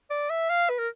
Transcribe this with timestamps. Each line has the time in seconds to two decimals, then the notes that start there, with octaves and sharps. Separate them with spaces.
0.10 D5
0.30 E5
0.50 F5
0.70 B4
0.79 A#4